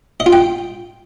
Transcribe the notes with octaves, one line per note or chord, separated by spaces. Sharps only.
D#5
F4
G5